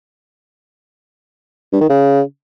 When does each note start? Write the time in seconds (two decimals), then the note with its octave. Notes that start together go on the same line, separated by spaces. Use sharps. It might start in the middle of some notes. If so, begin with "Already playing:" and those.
1.73 G2
1.81 D#3
1.89 C#3